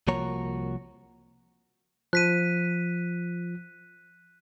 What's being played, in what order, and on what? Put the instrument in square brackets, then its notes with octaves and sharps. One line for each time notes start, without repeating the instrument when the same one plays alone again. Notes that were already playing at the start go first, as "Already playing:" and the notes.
[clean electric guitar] C2 F3 A#3 F#4 C#5 A#5
[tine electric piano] F3 [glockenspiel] F#6 B6 D#7